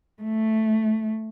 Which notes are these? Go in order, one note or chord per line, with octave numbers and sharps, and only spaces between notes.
A3